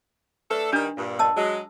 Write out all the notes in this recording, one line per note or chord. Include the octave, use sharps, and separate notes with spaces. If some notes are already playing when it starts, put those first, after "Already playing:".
A3 D4 A4 B4
D#3 G3 D4
G2 A#2
D#5 A5 E6
F#3 G#3